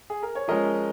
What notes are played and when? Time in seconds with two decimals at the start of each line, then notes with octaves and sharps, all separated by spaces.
0.10 G#4
0.23 A#4
0.35 C#5
0.48 F3 G#3 C#4 A#4 D#5